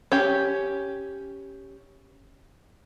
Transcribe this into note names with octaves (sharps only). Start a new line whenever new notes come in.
C#4 G4